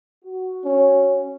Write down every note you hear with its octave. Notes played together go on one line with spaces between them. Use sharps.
F#4
C#4